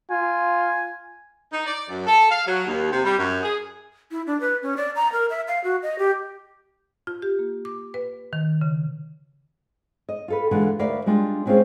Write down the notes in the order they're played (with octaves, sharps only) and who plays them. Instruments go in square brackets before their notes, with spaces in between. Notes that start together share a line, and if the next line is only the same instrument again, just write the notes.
[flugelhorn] F4 [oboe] G#5
[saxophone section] D#4
D5
F#2
A4
F5
F#3
D#2
C3
G3
F#2
G#4
[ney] E4
D4
B4
C#4
D5
A#5
A#4
E5
F5
F#4
D#5
G4
[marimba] F4
G4
A#3
D6
B4
D#3
C#3
[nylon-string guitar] D#5
F4 A4 B4
D3 E3 G#3 F4 A4 F#5
D2 A#4 B4 D5 E5 F5
G3 G#3 D4 F4
G3 G#3 C4 C#4 F4 G#4